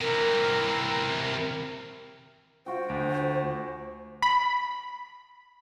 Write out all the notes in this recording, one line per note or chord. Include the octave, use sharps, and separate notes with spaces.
C3 E3 A#4
F4 F#4 C5 G5
D2 D7
B5